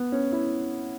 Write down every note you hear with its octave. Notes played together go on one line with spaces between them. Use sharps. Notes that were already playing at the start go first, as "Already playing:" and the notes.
Already playing: B3
C#4
E4